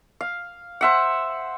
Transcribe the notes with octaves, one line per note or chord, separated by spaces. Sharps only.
F5
C5 E5 F#5